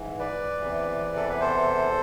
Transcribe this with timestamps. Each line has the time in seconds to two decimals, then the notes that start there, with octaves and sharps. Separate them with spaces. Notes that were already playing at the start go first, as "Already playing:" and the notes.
Already playing: G#2 E3
0.19 B4 D5
0.60 E2 C3 E3
1.16 A4
1.29 B4
1.41 A4 C5